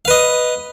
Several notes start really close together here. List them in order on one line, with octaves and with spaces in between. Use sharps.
F5 B4 D#5